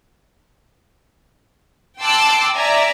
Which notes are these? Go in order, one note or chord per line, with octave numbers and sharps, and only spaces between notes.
G5 A5 C6 D6 E6 F#6
D5 E5 G#5 A#5